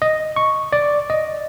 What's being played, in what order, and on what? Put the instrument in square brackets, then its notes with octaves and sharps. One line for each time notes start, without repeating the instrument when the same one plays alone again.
[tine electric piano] D#5
C#6
D5
D#5